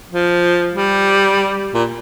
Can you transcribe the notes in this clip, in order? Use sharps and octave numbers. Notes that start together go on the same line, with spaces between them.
F3
G3
A#2